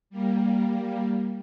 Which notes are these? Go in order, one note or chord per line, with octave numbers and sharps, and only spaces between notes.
G3 A#3